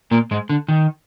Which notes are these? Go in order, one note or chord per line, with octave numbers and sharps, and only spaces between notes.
A#2 A#3
G#2 G#3
D3
D#3